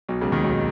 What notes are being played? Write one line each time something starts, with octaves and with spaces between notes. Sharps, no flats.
B1 B2
C#2 C#3
D#2 D#3
B1 B2